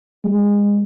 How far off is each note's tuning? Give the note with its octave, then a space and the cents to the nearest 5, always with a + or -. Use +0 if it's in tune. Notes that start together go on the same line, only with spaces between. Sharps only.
G#3 -25